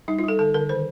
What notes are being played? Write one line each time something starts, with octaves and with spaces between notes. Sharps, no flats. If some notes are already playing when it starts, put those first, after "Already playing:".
G3 D#4
F4
G3 A4
D3 A4
D3 A#4
D#3 C5